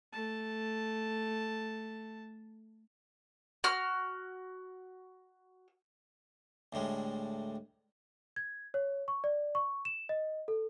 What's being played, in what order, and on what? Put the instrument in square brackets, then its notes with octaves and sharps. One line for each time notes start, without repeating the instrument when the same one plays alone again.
[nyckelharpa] A3 A5
[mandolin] F#4 F6
[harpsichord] D2 A2 G3 G#3
[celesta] G#6
C#5
C#6
D5
C#6
E7
D#5
A4